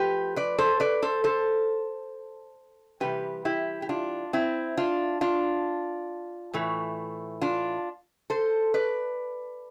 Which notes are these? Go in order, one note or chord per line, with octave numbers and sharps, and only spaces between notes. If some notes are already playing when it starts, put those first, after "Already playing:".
Already playing: F3 A3 G4 B4
B4 D5
A4 C5
B4 D5
A4 C5
A4 C5
C3 E3 G3 G4 B4
E4 G4
G4
D4 F4
C4 E4
D4 F4
D4 F4
A2 E3 A3
D4 F4
A4 C5
B4 D5